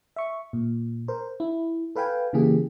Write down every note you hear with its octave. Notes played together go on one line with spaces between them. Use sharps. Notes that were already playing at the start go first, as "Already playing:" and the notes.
E5 C#6
A#2
A#4 C5
E4
A4 B4 F5 G5 G#5
C#3 E3 A#3 G4 G#4